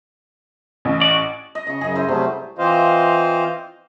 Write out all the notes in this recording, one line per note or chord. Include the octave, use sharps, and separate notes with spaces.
A1
F#4 D5
D#5
C#3 D#5 C#6
F#2 C#3 G#4 D#5
E4 C5
C3 F#3 G3 A3
E3 C4 F4 C5 D#5 F5